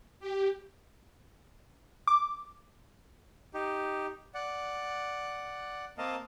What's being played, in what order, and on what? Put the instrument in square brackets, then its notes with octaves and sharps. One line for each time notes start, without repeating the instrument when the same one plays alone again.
[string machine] G4
[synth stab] D6
[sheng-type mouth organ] D#4 G4
D5 F#5
A#3 C4 A#4 D#5 F5 A5